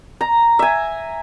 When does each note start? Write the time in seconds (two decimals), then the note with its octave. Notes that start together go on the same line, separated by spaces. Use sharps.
0.21 A#5
0.59 E5 G#5